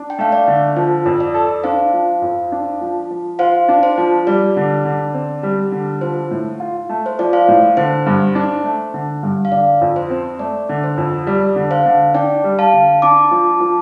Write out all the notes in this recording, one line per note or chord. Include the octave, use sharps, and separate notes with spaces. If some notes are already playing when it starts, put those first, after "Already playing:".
Already playing: D4
G5
A3 F5
D5
D3
F3 C5
F2
D5
A4
D4 C5 F5
F3
F2
D4
F3
F3
F4 C5 F5
D4
C5
F3
G3 D5
D3
D3
C4
G3
D3
F3 C5
A2
F4
A3
C5
F3 D5
C5 F5
A2
D3 C5
G2
D4
A3
D3
G2
F5
D3 D5
F2
C5
C4
A3 D5
D3
C5
F2
G3 D5
D3
C5 F5
D3
D4 D5 G5
G3
F5 A5
D3
D4 A5 D6
F3
F3